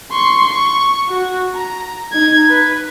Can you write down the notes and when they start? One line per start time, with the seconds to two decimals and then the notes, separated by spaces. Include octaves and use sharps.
0.11 C6 C#6
0.52 C#6
1.09 F#4
1.54 A#5
2.13 D#4 G#6
2.49 B4